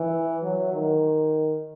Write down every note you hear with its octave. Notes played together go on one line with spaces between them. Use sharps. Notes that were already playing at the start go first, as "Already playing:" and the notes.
Already playing: E3
F#3
D#3